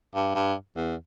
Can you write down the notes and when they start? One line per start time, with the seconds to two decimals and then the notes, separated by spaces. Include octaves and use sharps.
0.14 G2
0.35 G2
0.76 E2